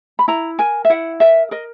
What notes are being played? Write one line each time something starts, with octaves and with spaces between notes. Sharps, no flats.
B5
E4 A#5
A#4 G#5
E5
E4 F#5
A#4 E5
A#4 D#5